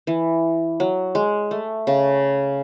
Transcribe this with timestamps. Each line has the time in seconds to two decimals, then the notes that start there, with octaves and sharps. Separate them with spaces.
0.07 E3
0.80 F#3
1.15 G#3
1.51 A3
1.87 C#3